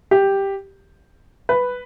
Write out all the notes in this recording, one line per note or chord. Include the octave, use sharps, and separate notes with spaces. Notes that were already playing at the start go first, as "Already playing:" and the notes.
G4
B4